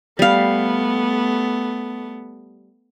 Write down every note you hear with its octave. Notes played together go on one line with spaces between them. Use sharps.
G3 A3 B3 F5